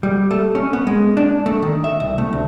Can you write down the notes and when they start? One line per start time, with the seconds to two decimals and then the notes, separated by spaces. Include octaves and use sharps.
0.03 G3
0.31 A3
0.55 C#4
0.73 B3
0.87 G#3
1.17 D4
1.46 A3
1.62 D#3
1.84 E5
2.00 C2
2.18 A3
2.33 D2